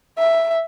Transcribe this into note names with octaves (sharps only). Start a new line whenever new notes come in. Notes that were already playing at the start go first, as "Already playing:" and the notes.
E5